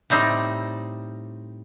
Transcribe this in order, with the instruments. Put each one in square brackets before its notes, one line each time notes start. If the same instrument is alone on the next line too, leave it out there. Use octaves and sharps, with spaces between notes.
[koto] A2 G3 C4 D#4